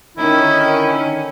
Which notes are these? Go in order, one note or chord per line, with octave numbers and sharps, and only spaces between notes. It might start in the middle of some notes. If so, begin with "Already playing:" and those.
D3 D#3 C#4 D#4 E4